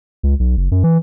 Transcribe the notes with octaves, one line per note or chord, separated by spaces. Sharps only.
C#2
B1
F#1
F#2
E3